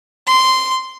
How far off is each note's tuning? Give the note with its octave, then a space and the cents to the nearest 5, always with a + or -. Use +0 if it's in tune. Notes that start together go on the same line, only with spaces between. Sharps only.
C6 -10